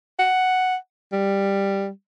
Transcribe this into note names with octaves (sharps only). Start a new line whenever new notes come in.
F#5
G3